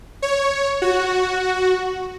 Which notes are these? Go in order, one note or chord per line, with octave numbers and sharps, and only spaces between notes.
C#5
F#4